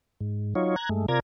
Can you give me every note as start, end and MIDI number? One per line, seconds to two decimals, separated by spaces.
0.21 0.54 44
0.55 0.76 54
0.55 0.76 63
0.55 0.76 65
0.55 0.76 73
0.76 0.89 82
0.76 0.89 90
0.76 0.89 92
0.89 1.06 43
0.89 1.06 56
0.89 1.06 57
1.08 1.20 48
1.08 1.20 65
1.08 1.20 70
1.08 1.20 74
1.08 1.20 82
1.08 1.20 92